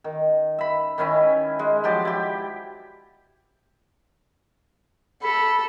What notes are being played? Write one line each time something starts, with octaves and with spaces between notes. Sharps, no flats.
D#3
E5 B5
D#3 C#4 E4 G#5
G#3
F3 F#3 G4 D5
E4 G4
A4 B5